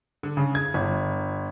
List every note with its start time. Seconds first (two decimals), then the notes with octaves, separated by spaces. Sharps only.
0.23 D3
0.37 C#3
0.55 G#6
0.74 G1